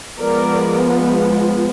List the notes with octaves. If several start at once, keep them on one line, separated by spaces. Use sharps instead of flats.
F3 G#3 B3 A#4 D5